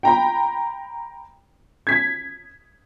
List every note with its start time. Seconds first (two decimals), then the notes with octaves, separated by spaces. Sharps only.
0.03 G5 A#5 B5
1.87 G#6 B6